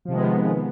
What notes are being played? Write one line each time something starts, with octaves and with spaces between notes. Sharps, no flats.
C3 D#3 F3 G#3 B3